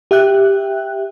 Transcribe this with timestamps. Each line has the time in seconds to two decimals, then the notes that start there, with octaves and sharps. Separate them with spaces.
0.11 G4 E5 G5 F#6